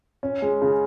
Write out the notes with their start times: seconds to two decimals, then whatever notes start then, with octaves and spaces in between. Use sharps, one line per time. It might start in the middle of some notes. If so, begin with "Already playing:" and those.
0.23 C#4
0.42 G#3
0.62 C#3